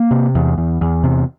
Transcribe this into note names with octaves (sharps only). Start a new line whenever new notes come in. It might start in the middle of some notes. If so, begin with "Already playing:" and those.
Already playing: A#3
C3
E2
E2
E2
C3